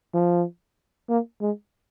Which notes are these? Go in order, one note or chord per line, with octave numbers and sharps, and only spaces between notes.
F3
A#3
G#3